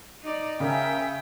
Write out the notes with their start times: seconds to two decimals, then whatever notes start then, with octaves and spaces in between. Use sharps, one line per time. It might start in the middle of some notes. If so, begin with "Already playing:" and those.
0.23 D#4 D5
0.60 C#3 C#4 A#4 E5 G5